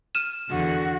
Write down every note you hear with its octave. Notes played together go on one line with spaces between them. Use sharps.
F6 D#7 E7
E2 D3 F#4